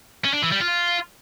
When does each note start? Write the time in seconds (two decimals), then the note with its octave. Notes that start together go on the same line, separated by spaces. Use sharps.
0.25 C#4
0.34 D4
0.43 E3
0.52 G3
0.61 F4